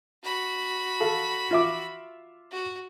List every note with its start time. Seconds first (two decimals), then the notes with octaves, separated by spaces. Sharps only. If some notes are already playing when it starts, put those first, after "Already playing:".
0.24 F#4 B5
1.00 A4 F5
1.51 F4 E5 D6
2.52 F#4